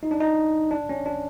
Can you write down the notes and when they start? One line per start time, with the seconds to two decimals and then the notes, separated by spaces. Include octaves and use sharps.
0.03 D#4
0.11 D4
0.20 D#4
0.71 D4
0.89 C#4
1.06 D4